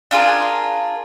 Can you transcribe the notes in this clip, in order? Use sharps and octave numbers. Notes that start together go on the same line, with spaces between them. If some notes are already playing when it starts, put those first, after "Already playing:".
D4 F4 G#4 A#4